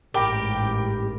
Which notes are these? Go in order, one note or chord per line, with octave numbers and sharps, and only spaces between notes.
A1 G#2 G4 A#4 G5 B5 A#6